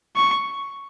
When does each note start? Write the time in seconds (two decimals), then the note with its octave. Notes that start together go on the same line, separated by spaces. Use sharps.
0.16 C#6